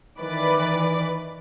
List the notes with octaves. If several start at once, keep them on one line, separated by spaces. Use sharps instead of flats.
D#3 E3 B4 D5 B5 D6